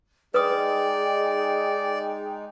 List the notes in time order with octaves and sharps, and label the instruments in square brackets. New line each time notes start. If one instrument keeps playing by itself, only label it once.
[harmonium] G#3 D#4 [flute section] G#4 G5 [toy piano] B4 D#6 [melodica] D5